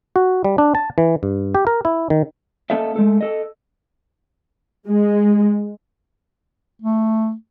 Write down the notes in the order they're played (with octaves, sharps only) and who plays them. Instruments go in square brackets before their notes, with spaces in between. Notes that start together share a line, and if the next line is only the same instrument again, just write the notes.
[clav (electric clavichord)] F#4
G3
D4
A5
E3
G2
G4
A#4
E4
D#3
[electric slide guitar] A#3 C#4 A4 D#5 E5
G#3 A3 A4
A4 D#5
[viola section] G#3
[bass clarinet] A3